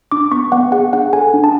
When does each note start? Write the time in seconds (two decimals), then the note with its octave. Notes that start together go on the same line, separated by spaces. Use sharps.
0.12 D4 D6
0.32 B3 C#6
0.52 B3 F#5
0.72 G#4 F#5
0.93 D4 F#5
1.13 A4 G#5
1.34 D4
1.44 A5